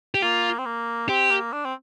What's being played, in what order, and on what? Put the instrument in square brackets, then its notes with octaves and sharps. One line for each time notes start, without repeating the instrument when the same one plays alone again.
[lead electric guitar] G4
[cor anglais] A#3 [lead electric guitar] F4
[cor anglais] C4
A#3
[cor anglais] C4 [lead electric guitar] G4
[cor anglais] A#3
D4
C4